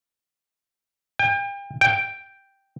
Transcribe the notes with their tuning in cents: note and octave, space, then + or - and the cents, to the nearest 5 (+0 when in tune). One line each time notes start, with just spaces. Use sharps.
G5 +35
G5 +0